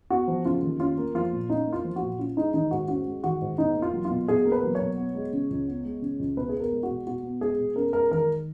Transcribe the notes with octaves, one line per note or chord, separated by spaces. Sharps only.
B3 F#4
F3
C#3 F4
D#2
C#4 F4
A#3
F3 F4
A#2
C#4 D#4
A#3
F4
F3
F#4
A#2
C#4 F4
G#3 D#4
D#3 D#4
G#2 F#4
C#4 F#4
G#3
D#3 F#4
G#2
B2 D#4
A#3
F4
F#3
F4
B2
B2 G#4
A#3
B4
F#3
B2 C#5
B3
G#3
C#3
C#2
B3
G#3
C#3
C#2
B2 B4
G#4
B3
A#4
G#3
F#4
B2
B2 F#4
B3
G#3 G#4
B2
C#4 A#4
G#3 A#4
D#3 A#4